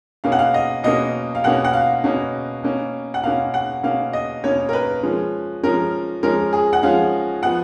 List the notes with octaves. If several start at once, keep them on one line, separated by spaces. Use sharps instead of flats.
B2 A#3 C#4 F5
F#5
F5
D#5
B2 A#3 C#4 D#5
F5
B2 A#3 C#4 F#5
F#5
F5
B2 A#3 C#4
B2 A#3 C#4
F#5
B2 A#3 C#4 F5
F#5
B2 A#3 C#4 F5
D#5
B2 A#3 C#4 C#5
A#4
B4
F3 G#3 C#4
F3 G#3 C#4 A#4
F3 G#3 C#4 A#4
G#4
F#5
F3 G#3 C#4 F5
F3 B3 F#5